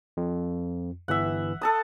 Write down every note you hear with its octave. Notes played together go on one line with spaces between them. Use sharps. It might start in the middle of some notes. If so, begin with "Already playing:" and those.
F2
G1 E3 E5 F#5
A4 A5 D#6